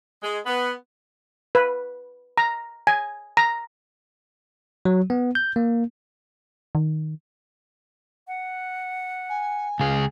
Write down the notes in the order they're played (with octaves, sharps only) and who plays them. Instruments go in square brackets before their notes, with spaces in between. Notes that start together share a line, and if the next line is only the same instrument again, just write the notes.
[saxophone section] G#3
B3
[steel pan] B4
A#5
G#5
A#5
[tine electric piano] F#3
B3
G6
A#3
[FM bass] D#3
[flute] F#5
[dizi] G#5
[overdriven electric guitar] C#2 G#4 [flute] F5